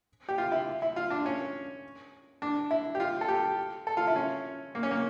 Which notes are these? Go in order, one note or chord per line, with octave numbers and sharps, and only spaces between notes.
G4
F4
E4
E4
F4
D4
C#4
D4
E4
G4
F4
A4
G4
A4
F4
E4
C#4
A#3
C#4
A#3